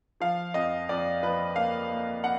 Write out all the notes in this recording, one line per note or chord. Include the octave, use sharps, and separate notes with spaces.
F3 F5
F2 D#5
F2 D5
F3 B4
A#3 F5
A#3
F#5